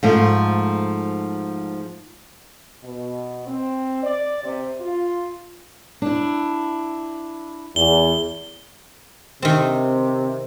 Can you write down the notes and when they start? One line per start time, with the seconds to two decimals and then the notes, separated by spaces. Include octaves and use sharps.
0.03 G#2 F3 A3
2.84 B2
3.48 C4
4.04 D5
4.44 C3
4.80 F4
6.02 D4 E4
7.76 E2 G7
9.42 C3 D#3 C4